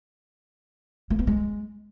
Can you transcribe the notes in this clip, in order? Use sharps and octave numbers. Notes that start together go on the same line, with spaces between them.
A3
B3
G#3